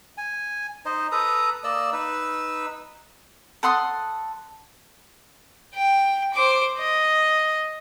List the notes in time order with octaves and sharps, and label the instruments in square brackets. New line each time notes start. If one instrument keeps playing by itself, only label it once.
[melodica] G#5
D#4 C5 D#5
A4 B4 A#5 D#6
A#3 D5 D#5 E6
D#4 B4 E6
[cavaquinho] A4 F#5 C6 D#6
[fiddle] G5
C5 D6
D#5